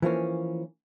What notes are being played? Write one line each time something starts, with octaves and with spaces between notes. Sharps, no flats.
E3 F3 A#3 C#4